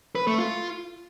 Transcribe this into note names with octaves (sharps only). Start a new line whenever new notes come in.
B4
A3
F4